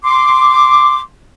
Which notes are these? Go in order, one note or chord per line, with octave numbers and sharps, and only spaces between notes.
C6 D6